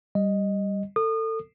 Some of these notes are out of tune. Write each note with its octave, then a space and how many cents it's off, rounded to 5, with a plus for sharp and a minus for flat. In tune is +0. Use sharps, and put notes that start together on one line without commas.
G3 +0 D#5 +0
A4 +25 D#6 -30